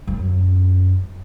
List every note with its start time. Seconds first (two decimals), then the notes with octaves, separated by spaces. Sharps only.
0.07 F#2